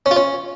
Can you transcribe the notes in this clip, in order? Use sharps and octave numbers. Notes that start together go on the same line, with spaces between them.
C#4
F4
C#4